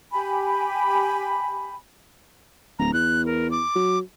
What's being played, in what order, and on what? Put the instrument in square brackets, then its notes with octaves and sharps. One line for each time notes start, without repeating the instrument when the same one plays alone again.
[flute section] G4 G#5 B5
[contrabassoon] D1 [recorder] A#5
[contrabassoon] E2 [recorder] F#6
[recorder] A#4
D6
[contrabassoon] F#3